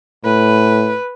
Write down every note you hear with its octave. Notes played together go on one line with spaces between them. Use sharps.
A2 B4